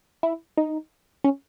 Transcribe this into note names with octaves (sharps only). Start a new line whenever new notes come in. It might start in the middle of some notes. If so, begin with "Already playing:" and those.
E4
D#4
C#4